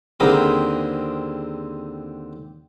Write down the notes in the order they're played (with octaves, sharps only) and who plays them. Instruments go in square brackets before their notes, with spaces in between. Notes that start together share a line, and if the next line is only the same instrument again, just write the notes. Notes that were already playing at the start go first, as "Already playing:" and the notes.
[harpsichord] D#2 D3 C4 G#4 A#4 B5